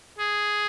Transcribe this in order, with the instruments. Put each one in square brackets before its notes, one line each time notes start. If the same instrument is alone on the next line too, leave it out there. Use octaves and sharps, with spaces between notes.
[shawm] G#4